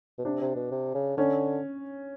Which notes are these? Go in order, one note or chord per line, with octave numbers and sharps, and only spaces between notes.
B2
C3 D4
C3
B2
C3
C#3
D3 C#4